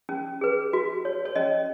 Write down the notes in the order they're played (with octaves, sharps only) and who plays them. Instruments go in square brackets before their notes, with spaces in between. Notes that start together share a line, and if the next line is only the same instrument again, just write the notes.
[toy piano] C#4
G#4 B4
F#4
C#5
C#5
C#4 D#5